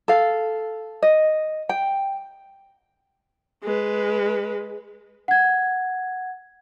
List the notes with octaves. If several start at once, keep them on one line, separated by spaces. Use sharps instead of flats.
A4 F5
D#5
G5
G#3 B4
F#5 G#6